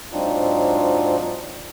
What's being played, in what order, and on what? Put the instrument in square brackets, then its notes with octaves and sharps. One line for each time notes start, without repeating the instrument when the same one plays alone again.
[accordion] G#2 F#3 C4 D4 D#4 F4